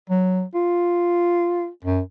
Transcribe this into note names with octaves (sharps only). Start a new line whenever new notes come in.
F#3
F4
F#2